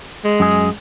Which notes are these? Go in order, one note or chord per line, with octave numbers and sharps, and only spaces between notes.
G#3
F#2 G#4